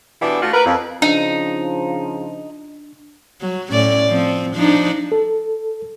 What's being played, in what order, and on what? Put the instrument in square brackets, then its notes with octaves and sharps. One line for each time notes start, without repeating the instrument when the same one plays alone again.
[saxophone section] B2 E3 B3 D4 E4 G4
A3 F4 F#4
A#4 B4
F2
[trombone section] C#3 F3 [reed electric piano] D4 [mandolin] D#4
[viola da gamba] F#3
A2 C#4 D5
F3 C4
F3 D4 D#4
[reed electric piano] A4